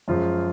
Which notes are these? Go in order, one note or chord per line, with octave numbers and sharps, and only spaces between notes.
F#2 F3 G#3 F4